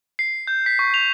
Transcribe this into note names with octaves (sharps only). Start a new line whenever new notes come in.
C7
G6
B6
C#6
F7